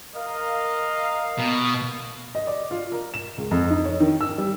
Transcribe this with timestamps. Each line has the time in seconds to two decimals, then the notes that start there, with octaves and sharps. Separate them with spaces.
0.15 A#4 D#5 F5
1.38 B2
2.35 D#5
2.47 D5
2.71 F4
2.92 A#4
3.14 E7
3.38 C#2
3.51 F2
3.70 D#4
3.85 C#5
4.00 D#3
4.21 E6
4.38 G3